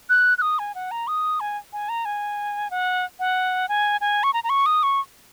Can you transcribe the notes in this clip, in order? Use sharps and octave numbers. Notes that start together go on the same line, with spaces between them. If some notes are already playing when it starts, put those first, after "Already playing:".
F#6
F#6
D#6
G#5
F#5
A#5
D#6
G#5
G#5
A#5
G#5
F#5
F#5
G#5
G#5
C#6
A#5
A#5
C#6
D#6
C#6